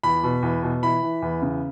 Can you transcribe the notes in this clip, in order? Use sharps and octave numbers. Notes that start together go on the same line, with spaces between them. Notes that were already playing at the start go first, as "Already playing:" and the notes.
E2 B5
B2
E2
B2
E3 B5
E3
E2
C#3